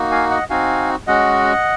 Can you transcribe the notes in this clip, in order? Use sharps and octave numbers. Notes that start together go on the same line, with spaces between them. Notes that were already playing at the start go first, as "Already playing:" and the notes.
Already playing: A#3 D#4 F#4
F5 G#5
D#5 F#5
C4 D#4 F#4 F5 G#5
G#3 C#4 F#4 D#5 F#5